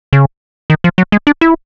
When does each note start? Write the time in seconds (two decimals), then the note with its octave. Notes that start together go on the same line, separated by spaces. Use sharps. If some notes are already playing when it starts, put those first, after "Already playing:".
0.13 C#3
0.70 D#3
0.84 F3
0.98 F#3
1.12 G#3
1.27 D4
1.41 E4